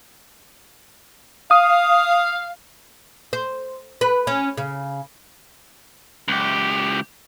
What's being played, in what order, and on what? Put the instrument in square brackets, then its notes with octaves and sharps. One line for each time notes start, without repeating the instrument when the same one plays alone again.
[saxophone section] F5 [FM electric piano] D#6
[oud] C5
B4
C#4
C#3
[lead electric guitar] C#2 G4